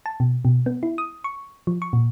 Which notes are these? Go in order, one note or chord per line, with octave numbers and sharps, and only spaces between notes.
A5
B2
B2
B3
E4
D#6
C#6
F3
C#6
A#2